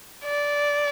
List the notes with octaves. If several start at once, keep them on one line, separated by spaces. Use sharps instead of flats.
D5